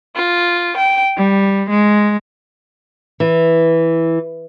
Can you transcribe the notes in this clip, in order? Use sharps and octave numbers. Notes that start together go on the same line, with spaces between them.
F4
G5
G3
G#3
E3